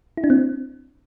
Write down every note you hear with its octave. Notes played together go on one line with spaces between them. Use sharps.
E4
D4
C4